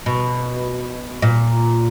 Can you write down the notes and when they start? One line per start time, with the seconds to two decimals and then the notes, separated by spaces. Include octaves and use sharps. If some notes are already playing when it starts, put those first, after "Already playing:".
0.06 B2
1.22 A#2